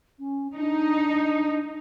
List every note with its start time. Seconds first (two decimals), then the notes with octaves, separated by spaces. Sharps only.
0.19 C#4
0.55 D4 D#4